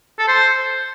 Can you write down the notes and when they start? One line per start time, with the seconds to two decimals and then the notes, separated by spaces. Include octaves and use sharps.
0.19 A4
0.28 C5